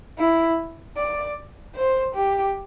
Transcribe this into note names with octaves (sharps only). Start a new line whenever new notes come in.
E4
D5
C5
G4